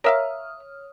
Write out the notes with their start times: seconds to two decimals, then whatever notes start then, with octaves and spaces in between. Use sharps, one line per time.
0.04 A#4 C#5 E5 F5 D#6 F6